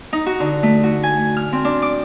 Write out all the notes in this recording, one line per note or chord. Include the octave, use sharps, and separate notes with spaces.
D#4
F#4
D3
A3
F#4
G#5
F6
C4
D4
D6